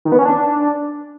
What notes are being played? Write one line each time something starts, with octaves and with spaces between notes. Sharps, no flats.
D#3
B3
C#4
D4